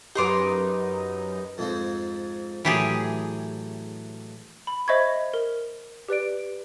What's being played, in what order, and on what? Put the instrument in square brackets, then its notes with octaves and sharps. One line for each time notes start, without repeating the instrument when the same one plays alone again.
[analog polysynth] F#2 D#4 [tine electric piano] G4 B4 [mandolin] A#5 C6 D6
[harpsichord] F2 G#2 C4
[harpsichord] A2 F#3 [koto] E3 G4 G#4
[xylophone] B5
C5 D#5 E5 B5 C#6 G#6
A#4
G4 B4 D5 D7